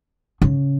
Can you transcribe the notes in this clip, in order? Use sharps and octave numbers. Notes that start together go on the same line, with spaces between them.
C#3